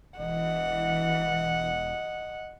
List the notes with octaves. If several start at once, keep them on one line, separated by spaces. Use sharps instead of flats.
E1 E3 D#5 F#5